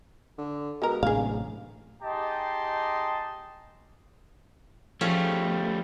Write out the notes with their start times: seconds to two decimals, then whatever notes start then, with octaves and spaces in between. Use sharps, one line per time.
0.38 D3
0.82 B2 G#3 A#4
1.03 D1 A1 A2 C3 G#4 F5
2.03 D#4 G4 G#4 D#5 A5 C6
5.01 F3 G3 A3 C#4